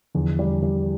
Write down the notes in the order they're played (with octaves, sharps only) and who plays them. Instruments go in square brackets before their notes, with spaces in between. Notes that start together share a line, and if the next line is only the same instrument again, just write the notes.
[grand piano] E2 [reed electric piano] D3 F3
[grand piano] G3
G3